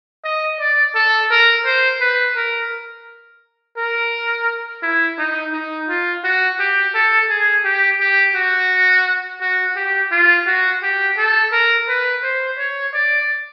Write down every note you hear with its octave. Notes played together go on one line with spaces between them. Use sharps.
D#5
D5
A4
A#4
C5
B4
A#4
A#4
E4
D#4
D#4
F4
F#4
G4
A4
G#4
G4
G4
F#4
F#4
G4
F4
F#4
G4
A4
A#4
B4
C5
C#5
D5